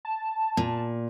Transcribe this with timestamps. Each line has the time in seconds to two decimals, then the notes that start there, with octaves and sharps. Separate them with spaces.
0.05 A5
0.57 A#2